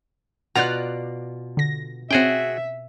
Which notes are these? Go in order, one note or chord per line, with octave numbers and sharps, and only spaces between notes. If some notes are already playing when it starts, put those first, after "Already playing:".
B2 F4 D5 F#5 A#5 F#6
D3 A#6
C4 C#4 F#4 G#4 E5 G5